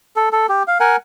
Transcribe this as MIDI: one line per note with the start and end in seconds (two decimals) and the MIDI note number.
0.16 0.29 69
0.33 0.46 69
0.49 0.63 67
0.68 0.78 77
0.80 0.96 70
0.80 0.96 78
0.80 0.96 80